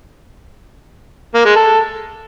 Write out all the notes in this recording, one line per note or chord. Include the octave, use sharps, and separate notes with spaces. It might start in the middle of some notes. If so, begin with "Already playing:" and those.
A#3
G#3
A4